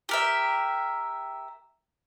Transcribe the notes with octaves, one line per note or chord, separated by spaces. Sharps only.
G4 A#4 E5